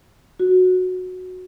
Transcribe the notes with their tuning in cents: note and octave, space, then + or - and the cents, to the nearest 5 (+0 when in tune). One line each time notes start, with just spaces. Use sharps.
F#4 -10